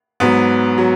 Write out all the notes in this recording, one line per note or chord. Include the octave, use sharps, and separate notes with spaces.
G#2 F#3 B3
F#3